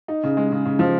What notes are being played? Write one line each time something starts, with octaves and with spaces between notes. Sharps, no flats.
D#4
C#3
G#3
C#3
C#3
F3